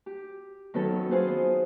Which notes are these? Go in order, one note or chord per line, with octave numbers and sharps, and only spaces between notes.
G4
D#3 F#3 B3 C#4 A4
B3 F4 G#4 C5